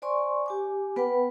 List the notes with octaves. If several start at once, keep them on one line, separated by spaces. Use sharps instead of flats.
C5 D5 G#5 C6 C#6
G4 G#5 D6
B3 B4 F#5 G5 B5